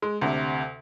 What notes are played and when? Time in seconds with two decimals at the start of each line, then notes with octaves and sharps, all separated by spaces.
0.02 G#3
0.22 D2 C3